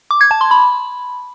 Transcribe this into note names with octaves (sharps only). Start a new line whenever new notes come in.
D6
G#6
A5
C6
B5